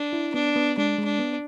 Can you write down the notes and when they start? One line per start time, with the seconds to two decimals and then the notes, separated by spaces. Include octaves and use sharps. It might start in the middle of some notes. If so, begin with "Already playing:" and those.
Already playing: D4
0.13 E4
0.34 B3 D4
0.56 B3
0.78 G#3 D4
0.98 G#3
1.05 D4
1.19 B3